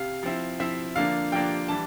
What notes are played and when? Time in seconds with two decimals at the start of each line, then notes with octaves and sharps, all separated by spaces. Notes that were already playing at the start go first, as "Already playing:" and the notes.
Already playing: C3 F5
0.23 F3 C4 E4
0.60 F3 C4 E4 E5
0.96 D3 F3 A#3 D4 F5
1.32 D3 F3 A#3 D4 G5
1.68 E3 G3 D4 A5